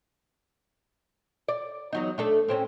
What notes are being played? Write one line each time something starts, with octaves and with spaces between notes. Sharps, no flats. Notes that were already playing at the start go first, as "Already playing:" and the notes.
D5
E2 F#3 D#4
A3 D4 A4
A2 C4 C#4